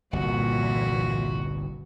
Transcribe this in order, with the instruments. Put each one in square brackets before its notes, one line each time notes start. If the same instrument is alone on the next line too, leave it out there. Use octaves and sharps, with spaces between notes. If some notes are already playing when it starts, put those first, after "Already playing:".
[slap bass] G1 C2 [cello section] A#2 E3 [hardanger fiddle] F#4